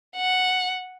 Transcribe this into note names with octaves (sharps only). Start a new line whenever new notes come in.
F#5